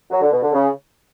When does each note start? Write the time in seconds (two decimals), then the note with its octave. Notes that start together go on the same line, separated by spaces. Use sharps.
0.11 F#3
0.21 D3
0.32 B2
0.42 D3
0.53 C#3